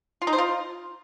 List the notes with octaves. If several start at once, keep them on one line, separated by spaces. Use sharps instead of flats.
F4
D#4
C5
F4